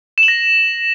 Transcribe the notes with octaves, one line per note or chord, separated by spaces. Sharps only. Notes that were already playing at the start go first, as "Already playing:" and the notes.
E7
F#7
A#6